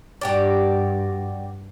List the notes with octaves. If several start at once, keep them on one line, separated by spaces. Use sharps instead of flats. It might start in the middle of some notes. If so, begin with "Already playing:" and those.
G2 F#4 G4 D5